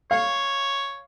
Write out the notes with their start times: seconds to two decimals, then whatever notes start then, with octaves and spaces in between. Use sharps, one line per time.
0.11 C#5 F5